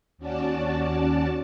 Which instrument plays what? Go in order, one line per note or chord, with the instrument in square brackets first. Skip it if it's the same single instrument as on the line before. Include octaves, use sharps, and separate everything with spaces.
[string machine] D#2 C#4 F#4 D5 A5